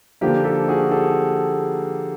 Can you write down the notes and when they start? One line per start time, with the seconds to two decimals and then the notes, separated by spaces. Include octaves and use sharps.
0.21 D3 F3 A#3 G4
0.44 G4 A4
0.68 F#4 G#4
0.91 G4 A4